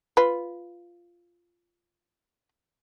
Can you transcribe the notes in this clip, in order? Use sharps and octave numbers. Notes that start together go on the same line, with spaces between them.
F4 B4